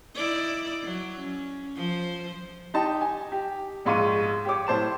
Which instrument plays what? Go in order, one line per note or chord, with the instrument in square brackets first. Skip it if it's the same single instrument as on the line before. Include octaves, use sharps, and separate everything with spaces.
[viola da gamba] D#4 E4 D5
F#3
C#4
F3 C5
[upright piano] D#4 G4 A5
G#5
G4
A#1 G#2 F5 C#6 D6 D#7
G4 C#5 D6
A2 C5 A5 E7